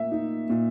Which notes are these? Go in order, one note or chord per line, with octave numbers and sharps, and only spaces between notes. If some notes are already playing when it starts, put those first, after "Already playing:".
Already playing: A#2 A#3 E5
D#4
A#2